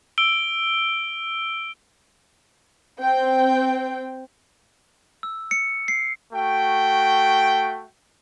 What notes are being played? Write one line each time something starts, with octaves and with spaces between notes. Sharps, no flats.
E6 D7 G7
C4 G5
E6
C#7
C7
A3 F#4 G5